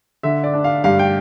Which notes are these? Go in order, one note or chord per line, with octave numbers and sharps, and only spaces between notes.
D3 E5
D5
D4
F5
G2 F5
G5